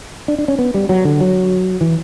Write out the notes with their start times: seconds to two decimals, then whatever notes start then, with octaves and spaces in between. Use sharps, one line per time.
0.28 D4
0.38 D4
0.48 C#4
0.59 B3
0.74 G3
0.89 F#3
1.05 D3
1.20 F#3
1.81 E3